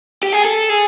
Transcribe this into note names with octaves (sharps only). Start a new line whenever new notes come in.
G4
G#4
A4
G#4